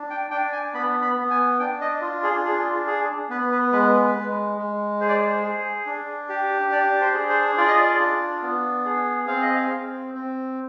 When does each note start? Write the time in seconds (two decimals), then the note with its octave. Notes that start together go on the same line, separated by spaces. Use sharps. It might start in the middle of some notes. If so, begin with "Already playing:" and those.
Already playing: D4
0.10 G5
0.31 D4 G5
0.52 G#5
0.74 B3 B5
1.02 B5
1.16 B3
1.30 G#5
1.59 D4 G5
1.81 D#5
2.01 F4
2.23 G#4
2.45 D4 G#4
2.87 G#4
3.29 B3 B4
3.52 B4
3.72 G#3 B4
3.94 B4
4.15 G#3
4.58 G#3
5.00 G#4 C5
5.09 D5
5.15 C5
5.43 G#4
5.86 D4
6.29 G4
6.72 D4 D5
7.01 C5
7.14 G#4
7.29 C5
7.58 F4 D5
7.68 D#5
7.78 D5
7.99 D4
8.42 B3
8.85 G#4
9.27 C4 F5
9.42 D#5
9.55 F5
9.70 C4
10.14 C4